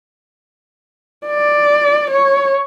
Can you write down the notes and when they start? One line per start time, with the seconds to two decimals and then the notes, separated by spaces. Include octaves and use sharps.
1.27 D5
2.11 C#5